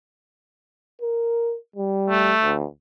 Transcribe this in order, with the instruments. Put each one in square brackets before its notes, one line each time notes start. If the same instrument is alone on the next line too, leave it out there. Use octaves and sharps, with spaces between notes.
[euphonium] A#4
G3
[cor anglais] A3
[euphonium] D2